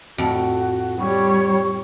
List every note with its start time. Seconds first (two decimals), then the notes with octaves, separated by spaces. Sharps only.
0.18 F2 A2 F#4
0.99 G3 C#5 C#6